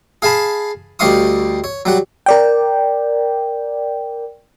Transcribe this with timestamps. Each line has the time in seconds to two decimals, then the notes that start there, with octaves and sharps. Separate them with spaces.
0.22 G#4 F5 G#5 A5 B5
0.99 D2 G3 D#5 F5 C#6 D#6
1.64 C#5
1.85 F#3 G3 F#5
2.26 A#4 D5 G5